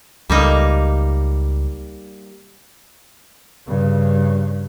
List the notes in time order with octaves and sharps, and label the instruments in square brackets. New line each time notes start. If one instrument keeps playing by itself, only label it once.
[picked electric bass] C#2 [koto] G3 A#3 D#4
[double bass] G2 C#3